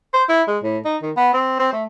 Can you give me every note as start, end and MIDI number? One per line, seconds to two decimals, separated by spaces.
0.14 0.24 72
0.29 0.43 64
0.48 0.58 56
0.63 0.78 45
0.85 0.97 63
1.02 1.11 51
1.17 1.29 59
1.34 1.57 60
1.59 1.69 60
1.73 1.84 57